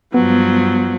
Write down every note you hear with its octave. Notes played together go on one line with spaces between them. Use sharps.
G2 F3 F#3 B3